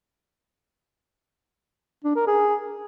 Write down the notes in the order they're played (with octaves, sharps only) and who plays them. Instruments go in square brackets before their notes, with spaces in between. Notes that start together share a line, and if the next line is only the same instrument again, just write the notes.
[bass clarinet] D4
A#4
G#4